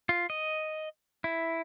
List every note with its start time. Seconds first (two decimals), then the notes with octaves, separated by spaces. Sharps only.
0.09 F4
0.30 D#5
1.24 E4